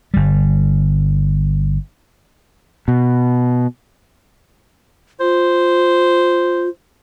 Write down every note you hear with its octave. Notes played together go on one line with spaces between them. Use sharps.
G1 G3
B2
F4 C5